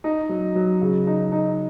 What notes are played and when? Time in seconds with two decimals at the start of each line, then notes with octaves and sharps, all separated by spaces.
0.04 D#4
0.29 F#3
0.55 F#3
0.81 C#3
1.07 D#4
1.32 D#4